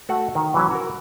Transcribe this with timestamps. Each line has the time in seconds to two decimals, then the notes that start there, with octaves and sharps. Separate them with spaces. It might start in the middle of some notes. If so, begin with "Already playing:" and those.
0.09 A3 F#4 F#5
0.35 D#3
0.54 E3 F#3 C#4
0.71 F#4 A#4